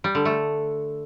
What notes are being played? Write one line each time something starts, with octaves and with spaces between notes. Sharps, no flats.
G3
D3
A3